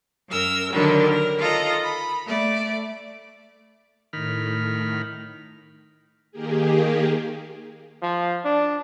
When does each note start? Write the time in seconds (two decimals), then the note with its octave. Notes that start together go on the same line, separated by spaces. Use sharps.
0.29 F#2 A#4 E6
0.72 D3 D#3 F#3 G3 D4
1.09 A#4
1.38 F4 A4 D#5 A#5
1.82 B5
2.27 A3 D5
4.13 A2 D#3 B5 F6
6.32 D#3 A#3 G4 G#4
8.02 F3
8.45 D4